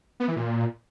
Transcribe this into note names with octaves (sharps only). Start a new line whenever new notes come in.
B3
E3
A#2